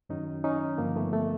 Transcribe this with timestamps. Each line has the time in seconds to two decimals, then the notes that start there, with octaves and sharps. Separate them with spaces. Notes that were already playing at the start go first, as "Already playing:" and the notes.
0.09 F#2 D#3 F#3 C#4 D#4
0.44 C#4 D#4
0.78 G2 D3 F3 A#3
0.96 A3 B3
1.13 A3